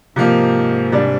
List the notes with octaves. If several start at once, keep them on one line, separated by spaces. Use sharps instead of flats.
G#2 C3 F3 A#3 D#4
C3 G3 D4